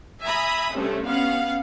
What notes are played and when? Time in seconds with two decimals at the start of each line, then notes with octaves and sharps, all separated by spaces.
0.22 E5 G#5 A#5 B5 D#6
0.72 G2 C3 A3 C#4
1.06 B3 C#4 F5 F#5